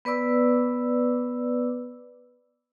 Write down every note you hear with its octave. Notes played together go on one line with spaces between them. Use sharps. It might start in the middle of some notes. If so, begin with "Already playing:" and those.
B3 B4 D5 D6 E6